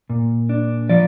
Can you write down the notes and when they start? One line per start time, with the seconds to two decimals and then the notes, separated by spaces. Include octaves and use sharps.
0.10 A#2
0.49 D4
0.89 F3 D5